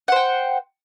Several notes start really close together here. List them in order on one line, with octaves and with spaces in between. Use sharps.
F#5 C5 G5